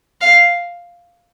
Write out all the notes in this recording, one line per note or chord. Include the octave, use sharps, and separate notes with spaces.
F5